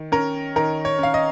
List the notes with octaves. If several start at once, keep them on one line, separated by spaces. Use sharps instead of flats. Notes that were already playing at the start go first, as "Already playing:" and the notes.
Already playing: D#3
C#4 A#4
D#3 A#4
C#5
C#4 F5
D#5